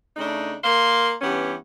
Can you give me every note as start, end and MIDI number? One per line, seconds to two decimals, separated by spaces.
0.17 0.56 49
0.17 0.56 57
0.17 0.56 62
0.17 0.56 63
0.63 1.14 58
0.63 1.14 70
0.63 1.14 77
0.63 1.14 84
1.21 1.55 43
1.21 1.55 52
1.21 1.55 59
1.21 1.55 61
1.21 1.55 67